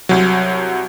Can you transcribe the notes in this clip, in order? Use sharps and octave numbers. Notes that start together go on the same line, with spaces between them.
C2 F#3